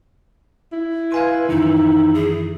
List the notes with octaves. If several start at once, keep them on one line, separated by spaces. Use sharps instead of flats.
E4
B4 F5 G#5 C6
F#2 D#3 E3 D#4
G#4